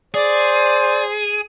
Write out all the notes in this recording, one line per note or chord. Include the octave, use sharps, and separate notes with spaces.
G#4 C5 D5